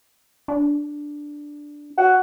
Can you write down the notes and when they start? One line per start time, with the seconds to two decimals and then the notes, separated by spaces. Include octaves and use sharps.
0.48 D4
1.98 F#4